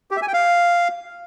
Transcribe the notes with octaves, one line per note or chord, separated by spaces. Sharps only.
G4
E5
G#5
G5
F5